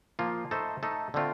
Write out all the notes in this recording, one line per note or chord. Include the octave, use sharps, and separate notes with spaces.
F3 A#3 F4
A3 D#4 A4 C5
A3 D#4 A4
D3 A3 C4 F4